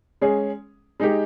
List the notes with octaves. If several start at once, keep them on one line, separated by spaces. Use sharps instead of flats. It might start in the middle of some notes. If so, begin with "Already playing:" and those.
G#3 C#4 G#4
G#3 D#4 G4